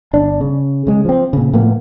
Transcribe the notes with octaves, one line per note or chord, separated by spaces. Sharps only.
G1 D4
C#3
C#3 G#3
F3 C4
A#2 C#3
A2 F3 A#3 B3